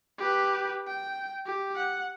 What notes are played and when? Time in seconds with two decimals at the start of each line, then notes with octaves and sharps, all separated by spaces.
0.18 G4 B4
0.87 G5
1.46 G4
1.76 F#5